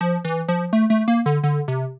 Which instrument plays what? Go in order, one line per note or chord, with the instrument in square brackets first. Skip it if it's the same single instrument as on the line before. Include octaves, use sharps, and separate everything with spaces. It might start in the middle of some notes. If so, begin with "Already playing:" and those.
[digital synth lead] F3
E3
F3
A3
A3
A#3
D3
D3
C3